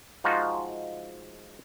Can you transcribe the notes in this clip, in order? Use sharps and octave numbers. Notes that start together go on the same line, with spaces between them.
F3 G#3 D#4 F4 F#4